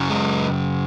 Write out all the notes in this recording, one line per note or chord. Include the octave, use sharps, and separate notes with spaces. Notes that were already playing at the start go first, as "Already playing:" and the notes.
Already playing: F#2 C#3 F#3
G#3